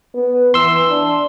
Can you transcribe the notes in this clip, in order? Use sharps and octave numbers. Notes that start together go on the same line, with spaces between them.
B3
E3 C6 E6
D4